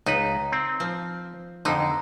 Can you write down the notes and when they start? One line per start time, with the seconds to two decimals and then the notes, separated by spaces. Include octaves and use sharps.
0.06 C#2 D#4 B4
0.52 C4
0.80 F3
1.65 F2 D3 D#4